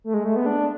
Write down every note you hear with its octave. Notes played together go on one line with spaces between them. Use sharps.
A3
G#3
A3
B3
D4